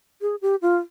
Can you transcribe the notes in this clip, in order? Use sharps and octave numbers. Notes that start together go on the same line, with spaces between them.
G#4
G4
F4